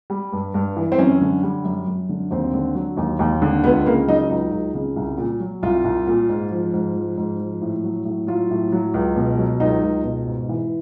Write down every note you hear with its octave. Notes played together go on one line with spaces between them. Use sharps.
G3
G2
G2
E3
C4
F#2 C#4
D3
G3
F#2
F#2
D3
D#2 C4
D3
F#3
D#2
D#2
D3
C#2 B3
C#3 A#3
F#3 D#4
C#2 D#4
C#2
C#3
C2
A#2
F#3
C2 F4
C2
A#2
G#2
F3
G#2
F3
G#2
F3
A2
F#3
A2
F#3 F4
A2
F#3
C#2
B2
F#3
C#2 D#4
C#2
B2
G#2
E3